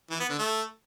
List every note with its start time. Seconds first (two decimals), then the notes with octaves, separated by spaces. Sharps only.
0.10 E3
0.20 B3
0.29 D3
0.39 A3